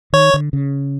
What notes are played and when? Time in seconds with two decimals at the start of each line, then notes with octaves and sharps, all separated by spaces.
0.13 D#3 C#5
0.34 D3
0.53 C#3